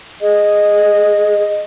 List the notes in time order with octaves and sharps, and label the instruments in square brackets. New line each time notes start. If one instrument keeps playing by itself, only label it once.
[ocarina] G#4 [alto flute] D#5